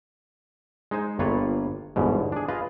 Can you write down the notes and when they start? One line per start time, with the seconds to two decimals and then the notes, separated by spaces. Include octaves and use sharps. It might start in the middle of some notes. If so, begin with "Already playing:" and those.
0.91 G#3 D#4 C5 G#5
1.19 G1 G2 A#3 F4 B4 C#5
1.96 G1 E2 G#2 B2
2.32 D4 G#4
2.48 F4 G#4 B4 D#5 F5